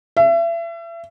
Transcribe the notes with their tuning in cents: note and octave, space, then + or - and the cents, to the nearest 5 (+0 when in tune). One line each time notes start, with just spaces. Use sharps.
E5 +35